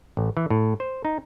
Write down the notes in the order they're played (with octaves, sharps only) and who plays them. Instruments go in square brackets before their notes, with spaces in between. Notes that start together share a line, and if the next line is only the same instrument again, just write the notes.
[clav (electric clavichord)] A1
E3
A2
C5
D#4